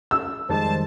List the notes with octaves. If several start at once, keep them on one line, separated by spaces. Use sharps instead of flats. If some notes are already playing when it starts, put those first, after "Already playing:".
E6
F2 D#3 G3 G#3 C5 A5